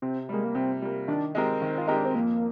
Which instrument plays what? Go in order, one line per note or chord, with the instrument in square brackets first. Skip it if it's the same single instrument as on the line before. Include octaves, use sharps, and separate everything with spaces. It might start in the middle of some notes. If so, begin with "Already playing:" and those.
[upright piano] C3 [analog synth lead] C4
[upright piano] G3 A#3 [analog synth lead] G#3
[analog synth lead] A#3
[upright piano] C3 [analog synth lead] C4
[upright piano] G3 A#3
[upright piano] D#3 [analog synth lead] D4
[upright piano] G#3 C4 G4 A#4
[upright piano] D#3 [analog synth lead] C4
[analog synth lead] F4
[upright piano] G#3 C4 G4 A#4 [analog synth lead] D#4
[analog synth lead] D4
C4
[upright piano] F2 [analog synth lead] A#3